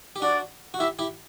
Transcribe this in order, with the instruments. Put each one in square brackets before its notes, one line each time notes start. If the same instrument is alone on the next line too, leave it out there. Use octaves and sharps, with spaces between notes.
[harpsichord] G4
[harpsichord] D4 F#4 [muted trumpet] D5
[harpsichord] F#4
[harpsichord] E4 G4 [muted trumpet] E5
[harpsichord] E4 G4